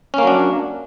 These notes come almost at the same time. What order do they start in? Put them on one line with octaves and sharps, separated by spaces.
C#4 A#3 F#3 D4